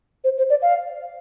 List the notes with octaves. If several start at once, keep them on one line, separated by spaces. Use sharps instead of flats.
C5
C5
D5
F5